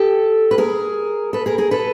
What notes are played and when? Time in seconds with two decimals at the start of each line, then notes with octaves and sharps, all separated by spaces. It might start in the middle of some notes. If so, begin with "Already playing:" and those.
Already playing: G4 A4
0.51 B4
0.58 G#4 A#4
1.33 A4 B4
1.46 G#4 A#4
1.58 G#4 A#4
1.71 A4 B4